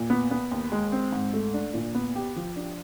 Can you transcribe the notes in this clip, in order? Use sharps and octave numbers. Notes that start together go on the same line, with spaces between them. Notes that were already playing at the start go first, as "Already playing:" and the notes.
Already playing: A#2
B3
B3
D#2
G#3
C4
G#2
A3
D4
A#2
B3
G4
F3
D4